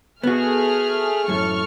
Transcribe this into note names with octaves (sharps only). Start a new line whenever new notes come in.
A3 B3 F#4 G#4 F6
F#2 A2 A4 C#6 F6